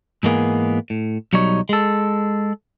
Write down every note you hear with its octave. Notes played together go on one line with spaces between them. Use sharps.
G#2 E3 G#3 A#3 B3 G#4
A2
B1 F#3 G3 D#4 C#5
G#3 A4